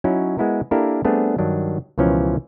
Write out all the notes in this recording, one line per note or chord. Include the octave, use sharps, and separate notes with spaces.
F#3 C#4 D#4 E4 F#4
G#3 B3 E4 F#4 A#4
A#3 D4 E4 G4 A4 A#4
G3 A3 B3 C4 D4 G#4
G2 D#3 F#3 D4
C#2 B2 E3 F3 C#4 A#4